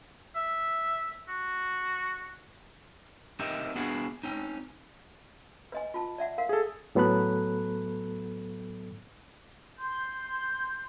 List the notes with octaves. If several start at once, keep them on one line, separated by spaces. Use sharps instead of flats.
E5
F#4
C4 D#4 G4 A#4 D#5 E5
B3 D4 E4 F#4 G#4 F#5
C4 C#4 D#4
B4 D#5 G#5
F4 A5
D5 E5 F#5
A#4 F5 F#5
G#4 A4
A2 F#3 B3 A4 B5 F#6
C6 G6